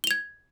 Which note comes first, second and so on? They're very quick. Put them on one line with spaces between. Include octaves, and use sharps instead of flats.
G7 F7 G#6